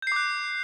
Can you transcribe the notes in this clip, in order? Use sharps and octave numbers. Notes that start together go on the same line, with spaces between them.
D6 F#6 G6 C7